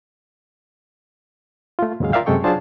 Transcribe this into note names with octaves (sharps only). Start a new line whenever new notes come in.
A3 F4
D#2 G#2 C#3 F#3 G#3 F5
F4 A#4 D5 E5 F5 G5
F#2 C3 G#3 A4 G5 C#6
F#3 D4 F4 G#4 C5 A5